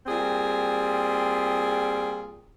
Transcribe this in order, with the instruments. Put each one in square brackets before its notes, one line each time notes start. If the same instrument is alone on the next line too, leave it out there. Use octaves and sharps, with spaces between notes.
[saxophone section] A#2 G3 C4 G#4